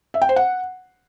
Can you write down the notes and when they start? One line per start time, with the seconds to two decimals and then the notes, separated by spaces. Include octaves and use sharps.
0.14 E5
0.22 G5
0.29 C5
0.36 F#5